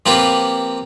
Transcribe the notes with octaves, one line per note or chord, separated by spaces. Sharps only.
F3 A#3 C4 F4 G4 B4